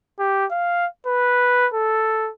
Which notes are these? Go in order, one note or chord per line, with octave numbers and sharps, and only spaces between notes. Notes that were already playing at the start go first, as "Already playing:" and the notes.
G4
F5
B4
A4